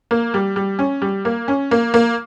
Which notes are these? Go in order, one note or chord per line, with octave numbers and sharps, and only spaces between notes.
A#3
G3
G3
C#4
G3
A#3
C#4
A#3
A#3